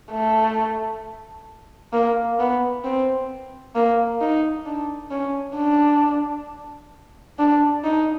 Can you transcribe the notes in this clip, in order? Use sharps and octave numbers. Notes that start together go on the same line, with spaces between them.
A3
A#3
B3
C4
A#3
D#4
D4
C#4
D4
D4
D#4